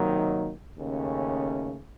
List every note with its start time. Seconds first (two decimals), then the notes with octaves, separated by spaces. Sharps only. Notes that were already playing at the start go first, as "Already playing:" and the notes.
Already playing: C3 D#3 F#3 A#3 D#4
0.77 D#2 C#3 A3 C#4